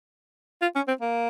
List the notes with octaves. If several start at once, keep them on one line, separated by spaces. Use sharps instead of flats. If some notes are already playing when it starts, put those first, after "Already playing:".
F4
C#4
C4
A#3